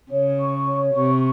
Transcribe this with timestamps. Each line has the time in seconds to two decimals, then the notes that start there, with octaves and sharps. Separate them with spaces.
0.11 C#3 C#5
0.39 C#6
0.67 C#5
0.94 C3 C#6